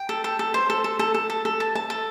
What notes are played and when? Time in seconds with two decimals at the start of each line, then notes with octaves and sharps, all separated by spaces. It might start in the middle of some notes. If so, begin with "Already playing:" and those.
Already playing: G5
0.09 A4
0.24 A4
0.39 A4
0.54 C5
0.70 A4
0.84 A4
0.99 A4
1.14 A4
1.30 A4
1.45 A4
1.60 A5
1.75 A5
1.90 A4